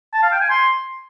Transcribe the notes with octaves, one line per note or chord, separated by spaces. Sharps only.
A5
F5
G5
G#5
C6